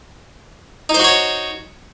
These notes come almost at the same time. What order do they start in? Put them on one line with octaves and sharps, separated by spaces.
D#4 C5 F#4 C#5